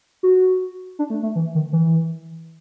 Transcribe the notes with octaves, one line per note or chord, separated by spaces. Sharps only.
F#4
D4
A3
A3
E3
D#3
E3